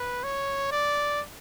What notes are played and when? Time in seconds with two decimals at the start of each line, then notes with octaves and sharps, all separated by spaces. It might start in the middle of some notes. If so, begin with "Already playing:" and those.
Already playing: B4
0.24 C#5
0.72 D5